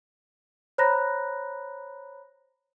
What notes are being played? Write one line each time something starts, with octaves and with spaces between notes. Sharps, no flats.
C5 C#5 A#5 B5 F#6 A#6